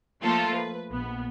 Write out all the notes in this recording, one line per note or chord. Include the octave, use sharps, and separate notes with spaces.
F3 A3 A#3 F4 A4
B4
A#1 B3